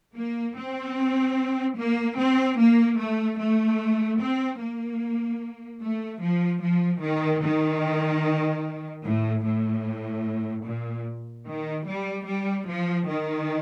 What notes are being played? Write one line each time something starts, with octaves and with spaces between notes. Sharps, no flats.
A#3
C4
A#3
C4
A#3
A3
A3
C4
A#3
A3
F3
F3
D#3
D#3
A2
A2
A#2
D#3
G3
G3
F3
D#3